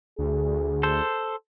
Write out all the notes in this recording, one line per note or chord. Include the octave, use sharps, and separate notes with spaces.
D2 G#4
A4 C5